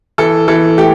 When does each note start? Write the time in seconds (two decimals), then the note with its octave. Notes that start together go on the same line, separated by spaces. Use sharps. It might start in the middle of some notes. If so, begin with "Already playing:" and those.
0.18 E3 A4
0.48 E3 A4
0.78 A3 G4